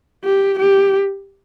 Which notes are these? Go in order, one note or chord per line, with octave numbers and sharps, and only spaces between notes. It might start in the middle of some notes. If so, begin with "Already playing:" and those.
G4
G4